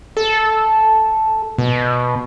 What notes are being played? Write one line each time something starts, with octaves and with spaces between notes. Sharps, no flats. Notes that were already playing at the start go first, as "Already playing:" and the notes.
A4
B2